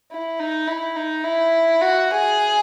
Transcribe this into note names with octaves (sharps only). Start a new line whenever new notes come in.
E4
D#4
E4
D#4
E4
F#4
G#4